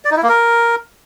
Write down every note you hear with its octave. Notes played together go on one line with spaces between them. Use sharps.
D5
D#4
E4
A#3
A#4